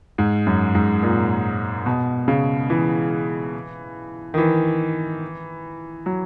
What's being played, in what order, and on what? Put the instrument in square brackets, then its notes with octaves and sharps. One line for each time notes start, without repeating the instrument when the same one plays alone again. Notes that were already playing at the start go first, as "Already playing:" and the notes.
[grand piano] G#2
F#2
G#2
A#2
B2
C#3
E3
D#3
E3
F#3